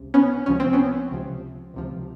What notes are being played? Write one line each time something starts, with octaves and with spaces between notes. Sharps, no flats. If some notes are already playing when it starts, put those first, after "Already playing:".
Already playing: C#2 C3
B3 C#4
C#2 C3 F3 C#4
C4
B3 C#4
C#2 C3 F3
C#2 C3 F3